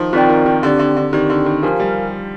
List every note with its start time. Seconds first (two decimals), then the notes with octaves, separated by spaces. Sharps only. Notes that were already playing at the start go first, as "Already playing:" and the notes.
Already playing: D#3 F3
0.13 D#3 C4 F4 A#4 D5 G5
0.30 D#3
0.46 D#3
0.62 D3 C4 G4 D5
0.79 D3
0.97 D3
1.13 D#3 C4 G4 D5
1.30 D3
1.46 D#3
1.63 F3 G4 A#4 F5 G#5
1.80 G3